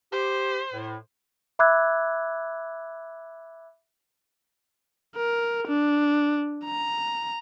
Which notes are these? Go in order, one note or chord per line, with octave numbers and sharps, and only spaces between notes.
G4 C5
A2
E5 B5 D6 E6 F#6 G#6
A#4
D4
A#5